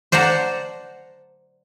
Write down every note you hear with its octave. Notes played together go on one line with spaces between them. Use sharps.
C5 D5 F#5 A5 A#5